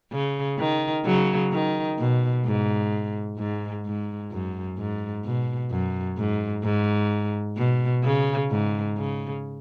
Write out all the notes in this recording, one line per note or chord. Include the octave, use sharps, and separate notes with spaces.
C#3
D#3
C#3 F#3
D#3
B2
G#2
G#2
G#2
F#2
G#2
B2
F#2
G#2
G#2
B2
C#3
G#2
C#3